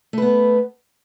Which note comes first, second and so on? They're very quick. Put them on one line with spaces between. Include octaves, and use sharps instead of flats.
A3 B4 B3